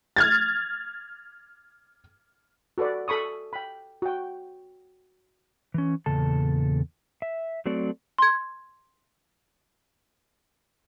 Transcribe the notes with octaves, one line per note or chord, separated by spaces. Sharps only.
F6 G#6 A6
F#4 A4 B4 D5
A4 B5 C#6 D#6
G5 B5
F#4 G5
E3 C#4
E2 A#2 C#3 A4 A5
E5
F#3 A3 C4 F#4 A4 D5
C6 G#6